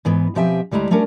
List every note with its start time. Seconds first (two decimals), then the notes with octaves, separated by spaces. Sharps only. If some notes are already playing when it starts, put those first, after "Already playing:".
0.05 G#2 E3 B3
0.35 B2 F3 C4 G4 E5 G#5
0.71 D2 G3 G#3 E4 A#5
0.90 G3 A3 C#4 D4 A#4